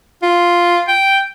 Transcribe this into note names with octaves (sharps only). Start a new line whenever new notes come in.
F4
G5